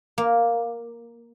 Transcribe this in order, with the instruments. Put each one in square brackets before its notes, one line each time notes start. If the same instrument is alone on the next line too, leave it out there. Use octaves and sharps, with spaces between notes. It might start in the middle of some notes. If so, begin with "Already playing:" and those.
[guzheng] A#3